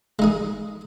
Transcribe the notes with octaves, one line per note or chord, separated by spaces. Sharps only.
G#3 D#4 G#4